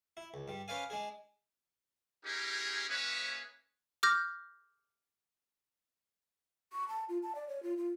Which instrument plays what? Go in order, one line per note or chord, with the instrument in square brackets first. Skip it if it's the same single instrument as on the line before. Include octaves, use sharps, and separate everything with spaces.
[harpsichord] E4
C#2
G2 G3
C#4 B4 C5 D5 F5 G#5
G#3 D4 G#4
[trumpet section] C#4 D#4 E4 G4 G#4 A#4
A#3 C#4 G#4 B4 C#5 E5
[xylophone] D6 F6 G6 A#6
[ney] C#6
A5
F4
A5
D5
C#5
F4
F4